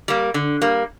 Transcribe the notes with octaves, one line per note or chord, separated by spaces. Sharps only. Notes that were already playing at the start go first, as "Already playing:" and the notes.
G3 A#3
D3
G3 A#3